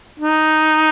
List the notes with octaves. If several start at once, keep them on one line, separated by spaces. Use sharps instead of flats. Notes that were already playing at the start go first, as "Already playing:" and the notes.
D#4